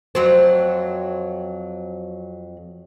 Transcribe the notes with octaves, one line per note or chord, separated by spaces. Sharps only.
F2 F#3 C4